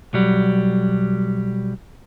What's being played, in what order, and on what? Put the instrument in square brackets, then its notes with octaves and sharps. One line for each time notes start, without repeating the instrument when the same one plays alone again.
[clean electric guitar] B1 F#3 G3